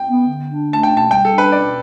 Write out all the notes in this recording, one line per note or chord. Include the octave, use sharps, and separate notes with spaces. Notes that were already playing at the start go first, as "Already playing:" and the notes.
Already playing: G5
B3
D3
D4
A3 A5
G5
B2
A5
G3 G5
A4
D4
B4
B2 D5